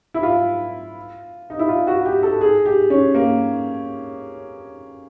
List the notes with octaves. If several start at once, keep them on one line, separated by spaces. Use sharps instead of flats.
E4
F4
D#4
E4
F4
F#4
G4
A4
G#4
G4
C#4
A#3